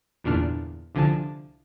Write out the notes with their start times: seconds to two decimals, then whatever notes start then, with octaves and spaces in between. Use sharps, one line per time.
0.24 G1 E2 A#2 D4 F6
0.95 C2 D3 F3 G#5 A5